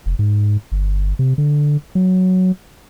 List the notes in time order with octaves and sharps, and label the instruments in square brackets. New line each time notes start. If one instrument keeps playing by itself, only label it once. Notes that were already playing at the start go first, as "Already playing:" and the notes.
[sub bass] F1
G#2
G1
C3
D3
F#3